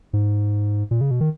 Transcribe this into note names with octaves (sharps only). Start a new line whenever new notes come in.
G#2
A#2
C#3
B2
D#3